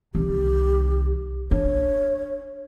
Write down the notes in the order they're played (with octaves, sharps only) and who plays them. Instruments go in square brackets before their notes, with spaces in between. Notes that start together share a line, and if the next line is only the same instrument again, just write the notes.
[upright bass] C2 D#3 [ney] G4
[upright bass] D4 [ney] C#5